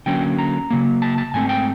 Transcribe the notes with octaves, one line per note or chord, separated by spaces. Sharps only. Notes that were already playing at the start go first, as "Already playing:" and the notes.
D3 F#3 A#3 C#4 G5
A#5
C#3 F#3 A#3
A5
A5
G#2 E3 A3 C4 G#5
G5